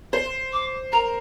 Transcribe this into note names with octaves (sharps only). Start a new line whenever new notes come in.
C5 C6
D6
A#4 A#5